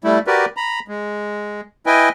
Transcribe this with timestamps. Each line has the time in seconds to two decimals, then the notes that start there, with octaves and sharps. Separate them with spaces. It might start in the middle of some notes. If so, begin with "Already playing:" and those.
0.04 G3 A3 E4
0.27 F#4 G4 A#4 B4 D5
0.57 A#5 B5
0.88 G#3
1.86 E4 B4 D#5 G5 G#5